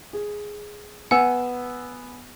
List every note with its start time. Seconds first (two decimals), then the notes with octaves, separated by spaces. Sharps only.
0.13 G#4
1.11 B3 F#5 G#5 E6